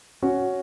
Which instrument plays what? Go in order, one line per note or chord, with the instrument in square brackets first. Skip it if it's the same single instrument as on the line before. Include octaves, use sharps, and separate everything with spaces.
[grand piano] C#4 F#4